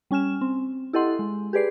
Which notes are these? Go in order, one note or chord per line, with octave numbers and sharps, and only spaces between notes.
G3 C#4 G#5 F6 E7
C4
E4 G4 A4 D#5 F#5 C6
G#3
G4 G#4 B4 D5 C7